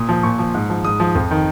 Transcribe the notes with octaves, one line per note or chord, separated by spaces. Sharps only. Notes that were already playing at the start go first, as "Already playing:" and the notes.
Already playing: A#2 D#6
F3
A#2 C#6
F3
G#2
F3
G#2 D#6
F3
F2
D#3